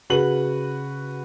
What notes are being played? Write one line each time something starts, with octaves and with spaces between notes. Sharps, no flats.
C#3 F#4 B4 F#7